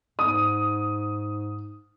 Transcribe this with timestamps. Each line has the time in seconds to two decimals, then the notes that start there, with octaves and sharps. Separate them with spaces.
0.19 G#2 D#6